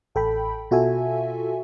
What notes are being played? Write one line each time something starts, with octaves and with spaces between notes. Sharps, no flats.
A1 A4 G5 B5
B2 F4 F#4 A4 E5 G#5